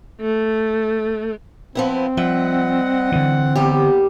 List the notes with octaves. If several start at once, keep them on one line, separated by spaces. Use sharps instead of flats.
A3
F3 B3 C4 E4
F3 G3 D#5 E5 F#5
D3 E3 C4
D#2 G3 B3 G4